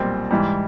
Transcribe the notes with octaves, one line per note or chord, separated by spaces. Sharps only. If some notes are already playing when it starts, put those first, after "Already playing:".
Already playing: B1 A#2 G3 C4
G#2 E3 G3